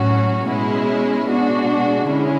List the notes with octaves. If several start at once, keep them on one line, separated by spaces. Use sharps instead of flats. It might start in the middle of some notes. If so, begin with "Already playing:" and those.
Already playing: A2 F#3 C#4 F#4
B2 G#3 C#4 E4
B2 G#3 D4 F#4
D3 G#3 C#4 E4